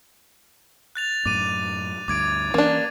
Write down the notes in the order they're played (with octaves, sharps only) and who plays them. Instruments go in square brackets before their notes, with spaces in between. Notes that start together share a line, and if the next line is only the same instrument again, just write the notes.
[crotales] F#6 A6 F7
[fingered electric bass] F#2 A2 [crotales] D6 D#7
[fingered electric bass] D2 G2 [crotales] D6 G#6 D7
[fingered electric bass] E3 C#4 [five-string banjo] A#3 D4